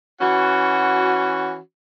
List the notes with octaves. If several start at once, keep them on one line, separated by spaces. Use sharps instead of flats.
E3 C#4 F#4